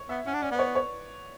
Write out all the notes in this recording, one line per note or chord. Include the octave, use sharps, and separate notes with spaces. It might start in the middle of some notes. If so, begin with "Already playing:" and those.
Already playing: C#5
B3 E5
C#4 F#5
D4
C#4 D5
B3 B4
C#5
C#5